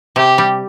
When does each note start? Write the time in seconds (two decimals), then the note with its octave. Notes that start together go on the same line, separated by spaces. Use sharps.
0.16 C3 G4
0.38 G3